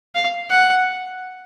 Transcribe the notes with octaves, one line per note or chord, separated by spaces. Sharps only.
F5
F#5